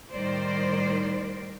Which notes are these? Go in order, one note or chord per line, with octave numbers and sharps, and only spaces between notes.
A2 D#3 G3 A#4 C5 D5